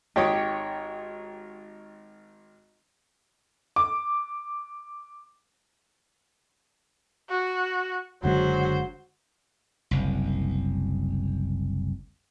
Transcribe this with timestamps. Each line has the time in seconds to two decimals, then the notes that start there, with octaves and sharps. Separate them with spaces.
0.16 G#1 G4 C#5 D#6
3.76 D6
7.30 F#4
8.23 F#1 D3 F#3 G#3 C5 F#5
9.91 F#1 C2